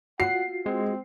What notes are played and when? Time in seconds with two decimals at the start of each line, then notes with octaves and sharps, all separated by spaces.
0.20 F4 F#4 F#5 C7
0.66 G#3 C4